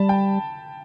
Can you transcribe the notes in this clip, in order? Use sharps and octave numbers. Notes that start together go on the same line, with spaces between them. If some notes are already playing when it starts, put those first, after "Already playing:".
Already playing: G3 A5 B5
G5